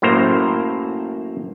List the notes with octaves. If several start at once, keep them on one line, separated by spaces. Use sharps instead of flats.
F#2 A2 A#3 C5 A#5